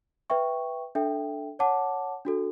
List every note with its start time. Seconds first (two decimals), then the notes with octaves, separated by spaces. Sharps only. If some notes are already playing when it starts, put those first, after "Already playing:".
0.30 B4 E5 G5 C#6
0.95 D4 A4 E5 G5
1.59 C#5 F#5 A5 D6
2.25 D4 F#4 A4